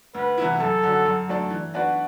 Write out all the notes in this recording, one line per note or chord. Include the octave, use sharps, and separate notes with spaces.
D2 B4
C3 E3 B3 E4
F#2 A4
D3 F#3
F#2
F#3 A3 D4 A4
E3
B3 D4 F#4 B4